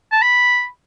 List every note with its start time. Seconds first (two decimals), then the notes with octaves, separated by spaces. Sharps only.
0.12 A5
0.22 B5